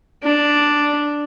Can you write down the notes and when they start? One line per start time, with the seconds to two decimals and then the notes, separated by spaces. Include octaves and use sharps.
0.23 D4